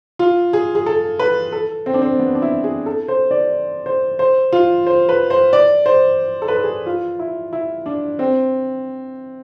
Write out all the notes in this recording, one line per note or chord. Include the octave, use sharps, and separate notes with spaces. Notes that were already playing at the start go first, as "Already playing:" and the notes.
F4
G#4
G#4
A4
B4
A4
C4
D4
C4
B3
D4
E4
G#4
A4
C5
D5
C5
C5
F4
C5
B4
C5
D5
C5
A4
B4
A4
G#4
F4
E4
E4
D4
C4